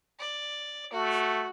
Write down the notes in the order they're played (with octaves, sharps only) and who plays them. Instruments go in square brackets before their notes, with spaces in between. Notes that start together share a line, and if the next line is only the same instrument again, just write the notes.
[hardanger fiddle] D5
[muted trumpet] A3 [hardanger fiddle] F#4